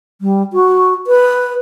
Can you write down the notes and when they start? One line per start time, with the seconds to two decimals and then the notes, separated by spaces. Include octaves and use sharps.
0.21 G3
0.53 F#4
1.07 B4